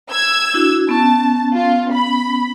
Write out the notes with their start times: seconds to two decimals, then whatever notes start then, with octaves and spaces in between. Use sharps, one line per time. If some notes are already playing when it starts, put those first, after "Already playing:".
0.10 E6 G#6
0.54 D4 E4 F#4
0.89 B3 C#4 A5
1.54 F4
1.93 B5